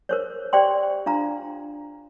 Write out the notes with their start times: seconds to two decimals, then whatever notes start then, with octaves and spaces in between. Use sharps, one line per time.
0.09 A#4 C5 C#5
0.53 G4 C5 D5 G5 C6
1.06 D4 F4 F5 A#5